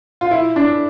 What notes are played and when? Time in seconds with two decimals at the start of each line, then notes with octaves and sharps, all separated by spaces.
0.21 F4
0.31 E4
0.56 D4